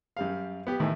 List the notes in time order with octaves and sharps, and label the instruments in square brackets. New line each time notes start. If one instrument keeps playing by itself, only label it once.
[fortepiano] F#2 G3 F5
B3 G4
[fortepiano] A2 E3 [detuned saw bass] D#3